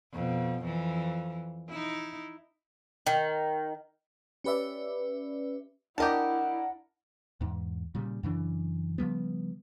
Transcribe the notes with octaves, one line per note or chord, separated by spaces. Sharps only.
F2 B2
F2 E3
D#4 E4
D#3
C#4 G4 B4 D5 E5
D4 E4 G4 A#4 D#5 F#5 A5
E2 G#2
A#2 C#3 G3
F#2 C#3 E3 D4
C#3 F3 G3 B3